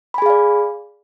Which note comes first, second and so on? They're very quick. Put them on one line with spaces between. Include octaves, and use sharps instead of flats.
B5 G#5 G#4 F5 D5